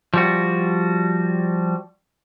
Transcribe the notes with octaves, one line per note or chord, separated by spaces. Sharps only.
F3 G3 F#4